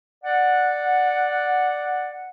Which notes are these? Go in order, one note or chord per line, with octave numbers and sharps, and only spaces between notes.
D5 F#5